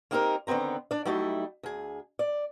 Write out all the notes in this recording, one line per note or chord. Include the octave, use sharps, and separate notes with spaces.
A#3 C4 D#4 G4 A4 A#4
D3 D#3 B3 C4 A#5
D4 D5
F#3 G3 A3 D#4 E4
D2 G#4
D5